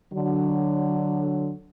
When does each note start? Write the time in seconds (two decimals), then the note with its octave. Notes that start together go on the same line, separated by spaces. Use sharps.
0.14 D3 F#3